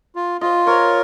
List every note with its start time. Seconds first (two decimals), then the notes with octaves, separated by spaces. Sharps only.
0.15 F4
0.41 F4 D#5
0.67 A#4 C#5